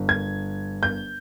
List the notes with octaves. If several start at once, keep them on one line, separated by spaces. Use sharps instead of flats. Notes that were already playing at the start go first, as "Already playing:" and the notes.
Already playing: G1
G#6
G6